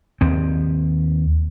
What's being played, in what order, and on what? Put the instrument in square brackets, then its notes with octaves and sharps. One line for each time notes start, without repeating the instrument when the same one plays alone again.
[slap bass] D#2 C4